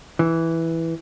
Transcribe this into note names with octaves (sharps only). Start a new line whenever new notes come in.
E3